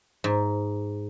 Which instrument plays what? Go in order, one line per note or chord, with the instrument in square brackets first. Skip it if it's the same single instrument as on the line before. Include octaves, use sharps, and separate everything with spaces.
[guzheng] G#2